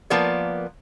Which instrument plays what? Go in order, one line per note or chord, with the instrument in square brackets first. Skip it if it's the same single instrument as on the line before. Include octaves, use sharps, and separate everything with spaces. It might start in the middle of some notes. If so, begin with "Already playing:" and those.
[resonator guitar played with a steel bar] F3 A#3 B3 A#4 D5